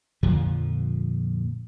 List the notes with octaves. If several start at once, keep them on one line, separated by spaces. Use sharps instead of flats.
F2 A#2 D3 F3